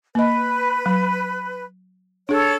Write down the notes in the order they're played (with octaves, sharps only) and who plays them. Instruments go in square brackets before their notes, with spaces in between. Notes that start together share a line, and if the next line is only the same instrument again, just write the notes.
[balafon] A#3 D#5 [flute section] B4
[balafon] F#3
[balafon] D4 G#4 [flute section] A4 C#5